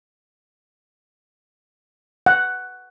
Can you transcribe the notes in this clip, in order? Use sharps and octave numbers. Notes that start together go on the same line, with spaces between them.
F#5